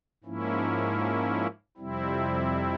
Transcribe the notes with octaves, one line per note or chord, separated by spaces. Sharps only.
G#2 F3 A#3 C#4 E4
F2 C3 G3 C4 E4